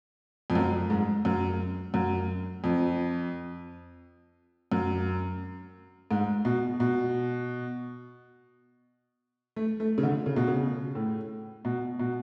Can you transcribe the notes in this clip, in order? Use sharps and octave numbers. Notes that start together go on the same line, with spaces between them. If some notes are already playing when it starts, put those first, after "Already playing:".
F2
F#2
G#2
F#2
F#2
F2
F#2
G#2
B2
B2
A3
A3
C#3
D3
C#3
B2
C#3
A2
B2
B2